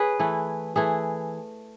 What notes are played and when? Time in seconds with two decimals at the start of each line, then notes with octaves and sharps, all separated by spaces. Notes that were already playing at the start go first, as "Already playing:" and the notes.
Already playing: G#4 B4 C#5
0.19 E3 A3 E4
0.76 E3 A3 E4 G#4